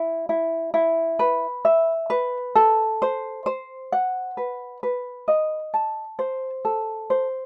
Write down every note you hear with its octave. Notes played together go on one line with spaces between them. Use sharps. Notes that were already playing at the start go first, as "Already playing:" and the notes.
Already playing: E4
E4
E4
B4
E5
B4
A4
C5
C5
F#5
B4
B4
D#5
A5
C5
A4
C5